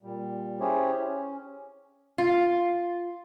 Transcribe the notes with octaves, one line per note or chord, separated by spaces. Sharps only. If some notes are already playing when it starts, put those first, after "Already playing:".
A#2 G3
C#4 E4 G4 G#4 C5 C#5
C#4
F4